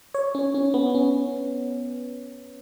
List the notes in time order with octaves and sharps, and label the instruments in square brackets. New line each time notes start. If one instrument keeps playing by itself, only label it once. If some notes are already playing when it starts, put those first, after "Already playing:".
[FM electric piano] C#5
C#4
C#4
B3
C#4